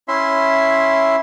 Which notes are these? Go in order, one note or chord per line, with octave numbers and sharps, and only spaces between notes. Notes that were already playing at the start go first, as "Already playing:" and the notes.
C#4 E4 E5 C6